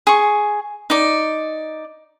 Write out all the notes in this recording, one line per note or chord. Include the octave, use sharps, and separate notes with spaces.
G#4 C#6
D#4 D5